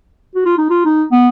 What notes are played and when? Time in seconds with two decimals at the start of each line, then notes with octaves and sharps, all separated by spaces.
0.35 F#4
0.45 F4
0.58 D#4
0.70 F4
0.85 D#4
1.12 B3